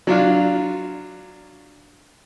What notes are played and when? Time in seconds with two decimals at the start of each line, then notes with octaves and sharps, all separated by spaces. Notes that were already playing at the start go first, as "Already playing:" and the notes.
0.07 F#3 D4 F4